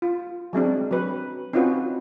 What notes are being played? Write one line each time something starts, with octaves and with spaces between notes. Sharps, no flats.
F4
F#3 G#3 C4 D4
F#3 B4
C4 C#4 D#4 F4 F#4 B4